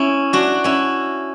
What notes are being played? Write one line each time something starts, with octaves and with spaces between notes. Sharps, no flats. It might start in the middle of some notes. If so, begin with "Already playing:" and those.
Already playing: C#4 E4
D4 F#4
C#4 E4